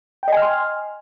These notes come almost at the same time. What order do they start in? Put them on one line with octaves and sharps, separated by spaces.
G5 D#5 G#5 F6 C6